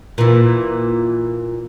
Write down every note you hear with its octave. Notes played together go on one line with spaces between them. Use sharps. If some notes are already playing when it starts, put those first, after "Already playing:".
A#2 E3